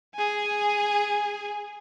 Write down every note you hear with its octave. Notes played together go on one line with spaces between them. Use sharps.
G#4 G#5